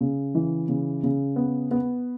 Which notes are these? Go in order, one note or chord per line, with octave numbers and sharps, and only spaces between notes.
C#3
E3
C#3
C#3
B3
B3